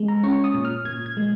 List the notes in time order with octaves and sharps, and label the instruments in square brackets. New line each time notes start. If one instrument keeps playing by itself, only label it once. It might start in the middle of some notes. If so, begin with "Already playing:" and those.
Already playing: [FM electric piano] G#3
A#5
C#4 C#6
D#6
A#2
F6
A#2 G#6
G#6
G#3